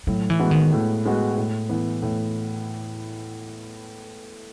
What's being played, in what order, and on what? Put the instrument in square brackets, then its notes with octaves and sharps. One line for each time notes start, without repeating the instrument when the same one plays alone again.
[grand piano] A2 [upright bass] F#3
[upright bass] E3
[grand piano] G#3 B3 F#4
[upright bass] D#3
[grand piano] A2
G#3 B3 F#4
A2
E3 B3
A2